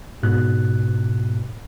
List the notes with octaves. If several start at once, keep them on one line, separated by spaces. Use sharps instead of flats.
G#2 B2 F#6